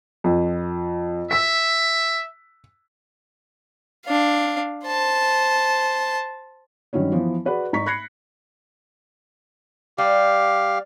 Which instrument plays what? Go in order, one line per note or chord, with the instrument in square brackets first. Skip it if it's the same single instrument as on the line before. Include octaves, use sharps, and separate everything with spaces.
[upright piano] F2
[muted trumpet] E5 [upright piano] E6 B6
[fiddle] D4 F5
C5 A5
[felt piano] G2 D#3 F#3 C#4 C#5
E3 F3 B3
F#4 G#4 B4 D5 F#5
G#1 D#4 A#5 C#6 B6
B5 F#6 G#6 A#6 C7 C#7
[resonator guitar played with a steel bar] G3 [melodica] G4 F5